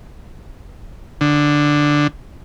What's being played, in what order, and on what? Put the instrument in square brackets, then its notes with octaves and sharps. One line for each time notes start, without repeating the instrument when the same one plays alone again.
[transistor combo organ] D3